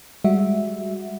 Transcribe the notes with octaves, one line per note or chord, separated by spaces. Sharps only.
G3 G#3 F#4 E5